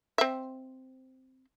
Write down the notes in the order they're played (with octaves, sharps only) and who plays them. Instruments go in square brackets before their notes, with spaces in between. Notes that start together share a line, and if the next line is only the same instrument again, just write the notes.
[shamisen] C4 E5